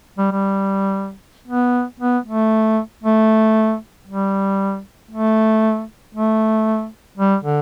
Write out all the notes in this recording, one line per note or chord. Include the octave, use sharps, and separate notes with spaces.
G3
G3
B3
B3
A3
A3
G3
A3
A3
G3
D3